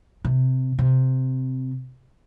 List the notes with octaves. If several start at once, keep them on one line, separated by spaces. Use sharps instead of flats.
C3
C3